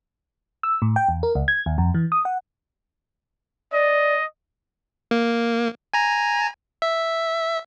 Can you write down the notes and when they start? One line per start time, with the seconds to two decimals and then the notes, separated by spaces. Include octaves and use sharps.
0.63 E6
0.82 A2
0.96 G5
1.08 E2
1.23 A#4
1.35 C#2
1.48 G#6
1.66 D#2
1.78 F2
1.94 E3
2.12 D#6
2.25 F#5
3.73 D5 D#5
5.11 A#3
5.94 G#5 A#5
6.82 E5